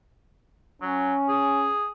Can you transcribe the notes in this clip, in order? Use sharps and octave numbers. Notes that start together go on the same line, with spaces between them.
F#3 C#4
G#4